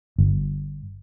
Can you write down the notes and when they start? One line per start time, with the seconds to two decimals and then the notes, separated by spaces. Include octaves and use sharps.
0.18 G1